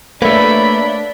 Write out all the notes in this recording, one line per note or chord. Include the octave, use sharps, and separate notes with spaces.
A3 A#3 D4 B4 C#5 E5 B5